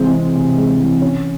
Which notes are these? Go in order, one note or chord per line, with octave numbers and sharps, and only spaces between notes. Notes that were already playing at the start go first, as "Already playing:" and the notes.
Already playing: C3 E3 G#3 C4
C4
C3
G#3
E3
C#4